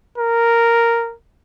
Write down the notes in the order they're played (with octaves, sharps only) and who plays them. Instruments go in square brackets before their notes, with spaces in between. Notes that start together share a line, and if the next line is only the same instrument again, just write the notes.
[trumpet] A#4